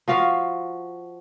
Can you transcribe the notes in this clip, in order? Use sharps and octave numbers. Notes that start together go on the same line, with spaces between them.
F3 F#4 F5